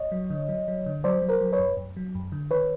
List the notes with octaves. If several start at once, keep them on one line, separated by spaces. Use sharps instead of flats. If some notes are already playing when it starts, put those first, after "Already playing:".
Already playing: C#5 D#5
F#3
D3
F#3
F#3
D3
F#3 C5 D5
F#3
A#4 C5
F#3
B4 C#5
F#2
F#2
F#3
F#2
D3
D#3 B4 C#5